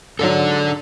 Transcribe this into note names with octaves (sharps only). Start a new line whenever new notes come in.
G#2 F#3 D4 A4